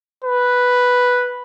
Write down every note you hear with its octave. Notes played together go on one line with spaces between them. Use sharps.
B4